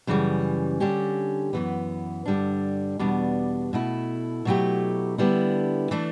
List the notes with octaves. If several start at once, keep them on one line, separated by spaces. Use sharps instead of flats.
F#2 C#3 E3 G3
D3 G3 C#4 G4
F#2 E3 B3
G2 D3 G3 D4
E2 B2 G3 B3 D4
B2 A3 E4
B2 F#3 A3 E4 G4
D3 G3 B3 E4
E3 A3 D4